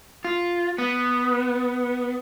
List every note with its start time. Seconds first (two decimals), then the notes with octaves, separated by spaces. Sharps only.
0.25 F4
0.78 B3